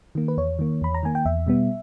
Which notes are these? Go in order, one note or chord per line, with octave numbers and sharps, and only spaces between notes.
D#3 A#3
B4
E2 C#5
D#3 A#3
E2 B5
A#5
D#3 A#3 G#5
G5
E2 E5
B2 G3 B3